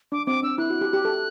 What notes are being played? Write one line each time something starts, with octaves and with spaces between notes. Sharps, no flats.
D4 D6
C4 D6
D4 E6
E4 F#6
F#4
G4
G4
A4